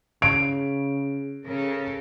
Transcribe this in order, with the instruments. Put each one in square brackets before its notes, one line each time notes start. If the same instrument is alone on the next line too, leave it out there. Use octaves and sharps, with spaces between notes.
[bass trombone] C#3 [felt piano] D7
[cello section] C#3 A4 A#4